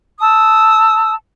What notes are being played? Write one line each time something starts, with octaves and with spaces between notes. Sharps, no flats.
A5 D#6 E6